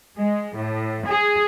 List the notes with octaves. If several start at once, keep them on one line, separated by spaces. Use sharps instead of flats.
G#3
A2
G#4